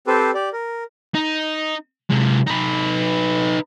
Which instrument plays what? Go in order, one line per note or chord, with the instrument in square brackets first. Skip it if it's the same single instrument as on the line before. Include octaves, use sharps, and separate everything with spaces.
[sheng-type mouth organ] C4 G4 A4 B4 C5
G4 D5
A#4
[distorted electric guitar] D#4
C3 G#3
D#4 B4